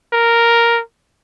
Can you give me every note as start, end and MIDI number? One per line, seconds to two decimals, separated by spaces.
0.13 0.80 70